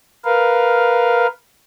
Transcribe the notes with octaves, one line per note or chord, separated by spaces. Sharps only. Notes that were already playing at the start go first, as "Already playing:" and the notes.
A#4 B4 F5